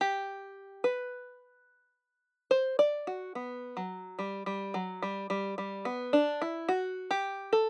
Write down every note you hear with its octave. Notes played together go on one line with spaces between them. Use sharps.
G4
B4
C5
D5
F#4
B3
F#3
G3
G3
F#3
G3
G3
G3
B3
D4
E4
F#4
G4
A4